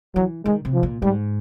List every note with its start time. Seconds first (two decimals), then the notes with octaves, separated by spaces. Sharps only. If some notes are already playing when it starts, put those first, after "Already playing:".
0.16 E3 F#3
0.46 D#3 G#3
0.65 C3
0.74 F3
0.83 A#2
1.02 G#2 G3